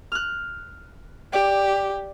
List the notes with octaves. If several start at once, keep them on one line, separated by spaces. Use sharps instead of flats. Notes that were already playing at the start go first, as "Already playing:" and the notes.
F6 F#6
G4 D5